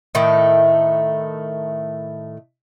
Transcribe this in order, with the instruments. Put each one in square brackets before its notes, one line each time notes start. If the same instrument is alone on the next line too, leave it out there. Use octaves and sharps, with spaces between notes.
[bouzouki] A2 D#3 A3